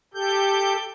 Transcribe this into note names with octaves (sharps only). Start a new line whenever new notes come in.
G4 A4 G6